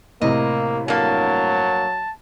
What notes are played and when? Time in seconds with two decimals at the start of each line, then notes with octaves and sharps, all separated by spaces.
0.21 A2 C3 A#3 D#5
0.88 G2 F#3 A#3 A5